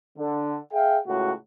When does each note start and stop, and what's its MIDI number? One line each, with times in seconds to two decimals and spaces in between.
0.18 0.56 50
0.72 0.97 68
0.72 0.97 76
0.72 0.97 77
0.72 0.97 79
1.06 1.31 37
1.06 1.31 45
1.06 1.31 66